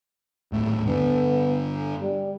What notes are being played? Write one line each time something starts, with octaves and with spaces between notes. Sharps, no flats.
D#1 A2
G2 D3 B3
G3